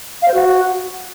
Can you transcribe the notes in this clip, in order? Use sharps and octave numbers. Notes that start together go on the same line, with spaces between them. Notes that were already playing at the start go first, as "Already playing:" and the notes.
F5
C5
F#4